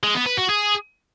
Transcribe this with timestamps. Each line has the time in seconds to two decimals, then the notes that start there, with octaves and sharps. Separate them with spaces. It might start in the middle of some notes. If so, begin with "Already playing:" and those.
0.03 G#3
0.15 B3
0.26 B4
0.38 F#4
0.49 G#4